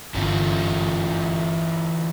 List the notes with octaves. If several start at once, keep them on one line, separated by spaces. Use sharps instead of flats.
G1 E3 C#4 F4